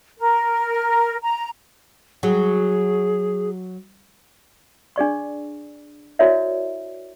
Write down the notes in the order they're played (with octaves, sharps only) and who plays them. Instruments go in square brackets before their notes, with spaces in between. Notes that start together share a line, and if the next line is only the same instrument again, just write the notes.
[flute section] A#4
A#5
[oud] F#3 [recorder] G#4
[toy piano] D4 G#4 D5 C#6
E4 F#4 A#4 C#5 D5 E5